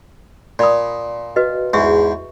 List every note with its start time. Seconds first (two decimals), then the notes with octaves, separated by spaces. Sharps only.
0.59 A#2 D5 B5 D#6
1.36 F#4 B4 D#5
1.73 E2 G#2 E5 C#6